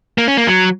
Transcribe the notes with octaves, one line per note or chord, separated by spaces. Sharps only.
A#3
C#4
A#3
F#3